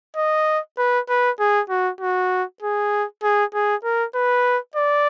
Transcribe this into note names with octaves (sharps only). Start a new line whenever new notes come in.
D#5
B4
B4
G#4
F#4
F#4
G#4
G#4
G#4
A#4
B4
D5